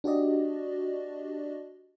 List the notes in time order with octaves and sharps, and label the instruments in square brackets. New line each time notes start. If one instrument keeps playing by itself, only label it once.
[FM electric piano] D4 F#4 G4 D5 D#5